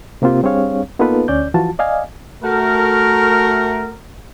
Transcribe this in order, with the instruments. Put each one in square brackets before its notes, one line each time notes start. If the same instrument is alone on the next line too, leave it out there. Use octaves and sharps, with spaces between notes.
[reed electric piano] C3 A#3 C4 F4 G4
G3 C4 D4 G#4 C#5 F5
A#3 B3 D#4 F4 A4 B4
D2 C#4 D5 G6
E3 F3 F4 F#4 A5
D5 D#5 F5 G#5
[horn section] A3 F#4 A#4